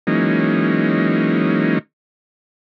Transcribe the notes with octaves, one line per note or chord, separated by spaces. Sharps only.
E3 F#3 G#3 A#3 C#4 D#4